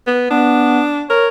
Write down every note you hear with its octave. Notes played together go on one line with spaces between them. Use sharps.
B3
B3 D4
A#4 C#5